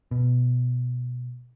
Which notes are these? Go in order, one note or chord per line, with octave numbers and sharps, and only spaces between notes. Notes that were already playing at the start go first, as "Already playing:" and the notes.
B2